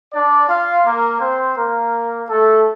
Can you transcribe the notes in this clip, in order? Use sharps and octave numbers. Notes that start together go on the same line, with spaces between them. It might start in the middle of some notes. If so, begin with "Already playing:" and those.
D4 D5
F4 F5
A#3 A#4
C4 C5
A#3 A#4
A3 A4